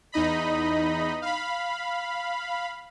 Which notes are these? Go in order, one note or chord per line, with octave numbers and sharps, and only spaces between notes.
E2 D#4 D#5 B5
F5 B5